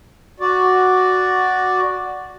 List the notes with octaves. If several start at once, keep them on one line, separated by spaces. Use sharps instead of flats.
F#4 D5